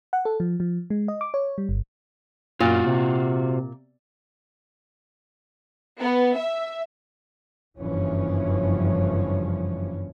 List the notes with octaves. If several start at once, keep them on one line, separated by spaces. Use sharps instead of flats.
F#5
A4
F3
F3
G#3
D#5
D6
C#5
G3
G1
F#2 A#2 F4 F#4
C3
B3
E5
F#1 G2 E3 F3 C#4